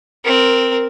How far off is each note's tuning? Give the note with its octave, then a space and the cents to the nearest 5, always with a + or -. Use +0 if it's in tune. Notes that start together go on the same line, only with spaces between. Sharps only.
C4 +0 A#4 +0